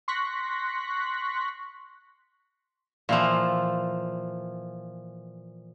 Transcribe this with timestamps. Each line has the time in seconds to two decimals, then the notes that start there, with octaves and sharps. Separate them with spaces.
0.08 C6 C#6 F#6 A#6 B6
3.09 A#2 E3 F3